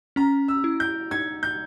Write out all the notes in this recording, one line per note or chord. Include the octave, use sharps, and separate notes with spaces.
C#4 A#5
E6
E4
G6
D#4 G#6
G6